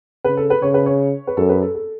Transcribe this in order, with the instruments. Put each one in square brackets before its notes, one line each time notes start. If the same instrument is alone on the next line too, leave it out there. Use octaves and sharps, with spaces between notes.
[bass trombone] C#3 [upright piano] B4
[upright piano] A4
B4
[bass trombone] C#3 [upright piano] C#5
[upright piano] B4
C#5
B4
[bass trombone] F#2 [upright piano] A4
[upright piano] B4
A4
A4